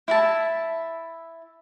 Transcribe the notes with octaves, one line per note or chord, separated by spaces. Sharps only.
E4 E5 A5